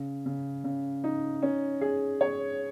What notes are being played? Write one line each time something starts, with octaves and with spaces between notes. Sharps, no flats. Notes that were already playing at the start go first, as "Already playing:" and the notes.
Already playing: C#3
C#3
C#3
D#4
C#4
G#4
C#5